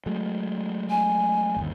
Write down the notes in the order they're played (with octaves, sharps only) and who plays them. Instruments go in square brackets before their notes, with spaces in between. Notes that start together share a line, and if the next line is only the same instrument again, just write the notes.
[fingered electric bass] F#3 G#3 A3
[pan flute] G#5
[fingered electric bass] G1 D#2